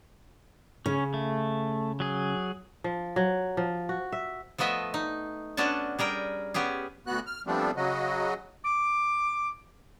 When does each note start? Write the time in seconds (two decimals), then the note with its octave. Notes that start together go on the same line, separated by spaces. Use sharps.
0.86 C#3 C#4
1.14 A3
2.00 F#3 G#4
2.84 F3
3.16 F#3
3.57 F3
3.89 F#4
4.12 E5
4.58 F3 A3 B3 D#5 E5
4.94 D#4
5.57 B3 C#4 D4 F#4 A5
5.99 G3 G#4 A#4 G5
6.54 B3 C#4 G4 G#4
7.07 D2 B3 F#4 F#6
7.26 F6
7.47 F3 G3 A3 B3 C4 D4
7.77 C#3 F#3 F#4 D#5
8.64 D6